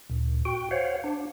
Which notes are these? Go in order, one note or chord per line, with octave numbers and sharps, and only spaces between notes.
D2 A#2
F#4 G5
C5 C#5 F5 F#5
D4